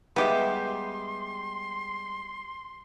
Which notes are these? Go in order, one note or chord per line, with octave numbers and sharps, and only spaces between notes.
G3 G#3 B3 G4 E5 C6